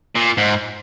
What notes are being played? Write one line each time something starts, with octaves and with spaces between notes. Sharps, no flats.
A#2
G#2